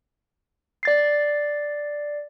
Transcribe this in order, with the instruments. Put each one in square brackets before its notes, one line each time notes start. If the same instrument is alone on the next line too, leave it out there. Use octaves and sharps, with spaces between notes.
[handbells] D5 A6 C7